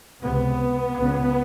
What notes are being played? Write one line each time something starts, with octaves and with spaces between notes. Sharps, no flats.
C#2 C3 B3
C#2 C#3